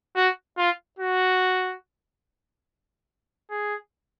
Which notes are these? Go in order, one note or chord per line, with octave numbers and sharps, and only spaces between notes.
F#4
F4
F#4
G#4